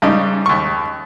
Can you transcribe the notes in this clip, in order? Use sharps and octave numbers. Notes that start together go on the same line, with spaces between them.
G#2 C#3 G3 D#4
D#2 C#6